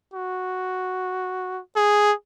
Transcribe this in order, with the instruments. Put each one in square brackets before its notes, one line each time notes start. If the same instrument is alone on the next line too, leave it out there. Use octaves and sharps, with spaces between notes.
[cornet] F#4
G#4